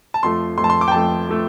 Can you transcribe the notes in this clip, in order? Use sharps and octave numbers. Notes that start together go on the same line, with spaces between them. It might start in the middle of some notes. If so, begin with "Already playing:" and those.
A5
F2 F3 A3 C6
F2 F3 A3 C6
A5
C6
D6
G5
F2 F3 A3 A5
F3 A3